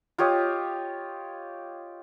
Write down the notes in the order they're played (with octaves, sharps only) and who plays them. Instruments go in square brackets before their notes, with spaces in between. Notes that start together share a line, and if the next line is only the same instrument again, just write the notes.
[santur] F4 G4 C#5 D#5